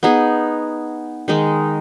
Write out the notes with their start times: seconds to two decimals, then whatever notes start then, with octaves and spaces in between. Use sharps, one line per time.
0.03 B3 D#4 G#4
1.28 D#3 G#3 D#4